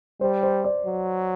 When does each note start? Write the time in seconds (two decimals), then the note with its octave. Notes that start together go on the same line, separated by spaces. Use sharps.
0.21 G3 C5
0.43 C5
0.64 D5
0.86 F#3